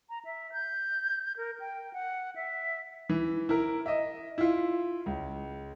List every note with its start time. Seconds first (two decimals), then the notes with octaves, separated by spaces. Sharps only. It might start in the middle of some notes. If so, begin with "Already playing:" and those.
0.10 A#5
0.25 E5
0.53 G6
1.37 A#4
1.60 G5
1.93 F#5
2.36 E5
3.09 E3
3.49 E4 A#4
3.86 D#5 E5
4.38 E4 F4
5.06 C#2